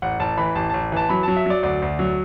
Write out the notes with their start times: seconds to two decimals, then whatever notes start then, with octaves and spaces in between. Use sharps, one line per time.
0.02 A1 F#5
0.19 A1 A5
0.37 E3 B5
0.55 A1 A5
0.69 A1 A5
0.92 E3 A5
1.09 F#3 B5
1.23 F#3 A5
1.36 E5
1.46 F#3 D5
1.63 D2 D5
1.82 D2
1.99 F#3